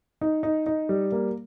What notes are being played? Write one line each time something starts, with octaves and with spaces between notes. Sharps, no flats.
D#4
D#4
D#4
G3
A#3